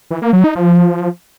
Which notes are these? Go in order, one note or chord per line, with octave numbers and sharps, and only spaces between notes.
E3
A#3
F#3
D#4
F3